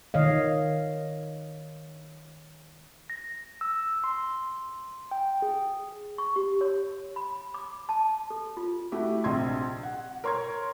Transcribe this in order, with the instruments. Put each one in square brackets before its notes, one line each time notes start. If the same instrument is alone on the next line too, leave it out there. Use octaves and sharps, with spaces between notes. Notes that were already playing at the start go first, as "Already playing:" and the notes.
[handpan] D#3 C#5 D#5 F5
[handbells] A#6
E6
C6
G5
G#4
[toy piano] C#6
G4
C#5
B5
D6
A5
A4
F4
[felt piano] A3 E4 F#4 G4
A#1 C3 D#5 C6 G#6
F#5
A#4 C#5 C6 C#6 G#6